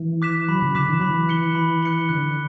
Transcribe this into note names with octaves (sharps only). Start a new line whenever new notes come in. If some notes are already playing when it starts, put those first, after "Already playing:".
Already playing: E3
D6 F#6 B6 E7
F#3 B5
C#3
D3 D6 F#6 B6 E7
E3
F#3 B5
E3
F#6 C#7 G7
B5
F#6 C#7 G7
D3 F#6